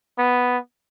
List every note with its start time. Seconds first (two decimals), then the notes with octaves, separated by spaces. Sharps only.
0.19 B3